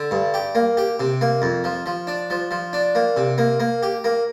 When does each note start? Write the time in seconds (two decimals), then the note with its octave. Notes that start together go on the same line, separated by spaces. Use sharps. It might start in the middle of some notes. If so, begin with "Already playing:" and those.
Already playing: D3
0.11 G2
0.34 G4
0.55 A#3
0.77 G4
1.00 C3
1.21 A#3
1.42 F2
1.64 F3
1.86 F3
2.07 D4
2.30 F3
2.51 F3
2.73 D4
2.95 A#3
3.17 C3
3.38 A#3
3.60 A#3
3.83 G4
4.04 A#3